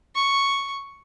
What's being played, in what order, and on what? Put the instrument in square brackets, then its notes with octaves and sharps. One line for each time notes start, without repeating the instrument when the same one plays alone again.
[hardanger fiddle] C#6